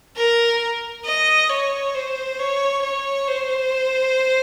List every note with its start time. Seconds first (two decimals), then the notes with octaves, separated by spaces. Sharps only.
0.16 A#4
1.05 D#5
1.49 C#5
1.94 C5
2.39 C#5
2.83 C#5
3.28 C5